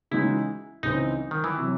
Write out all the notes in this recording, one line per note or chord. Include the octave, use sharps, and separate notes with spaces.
C#3 E3 G#3 D#4 E4 F#4
C#2 C#3 E3 C4 D#4
D#3
E3
C3 F#3